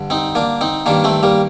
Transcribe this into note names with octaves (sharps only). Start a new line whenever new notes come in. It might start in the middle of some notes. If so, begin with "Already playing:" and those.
Already playing: G2 D3
C4 D#4
A#3 D4
C4 D#4
G2 D#3 A#3 D4
A3 C4
G3 A#3